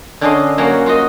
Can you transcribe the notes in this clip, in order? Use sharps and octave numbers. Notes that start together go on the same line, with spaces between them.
D3 C#4 D4 D5 D#5 C6
F#3 A#3 C#4 F#4
F4 F#4 D#5